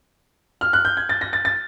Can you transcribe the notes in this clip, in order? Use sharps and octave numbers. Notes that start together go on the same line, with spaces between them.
F6
F#6
G6
G#6
A6
A#6
A6
A6